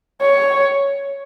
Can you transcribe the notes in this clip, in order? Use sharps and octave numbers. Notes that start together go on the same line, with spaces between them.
C#5